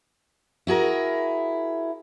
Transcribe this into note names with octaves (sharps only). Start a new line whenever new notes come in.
E4 F#4 G#4 A#4